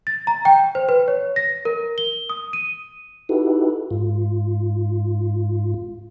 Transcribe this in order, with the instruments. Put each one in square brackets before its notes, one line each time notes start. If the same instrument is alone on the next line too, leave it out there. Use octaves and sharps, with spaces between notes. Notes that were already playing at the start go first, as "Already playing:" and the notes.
[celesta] A6
A#5
G5
C5
B4
C#5
A#6
A#4
G7
D#6
D#7
[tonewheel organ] D#4 E4 F#4 G4 A4 B4
G#2 F4